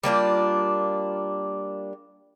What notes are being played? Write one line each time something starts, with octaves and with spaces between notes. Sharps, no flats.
G3 A#3 D4 F4